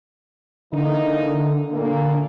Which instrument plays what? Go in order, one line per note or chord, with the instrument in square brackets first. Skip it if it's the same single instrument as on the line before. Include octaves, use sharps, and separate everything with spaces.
[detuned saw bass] D3 [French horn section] E3 A#3 D#4
[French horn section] A#2 A3 A#3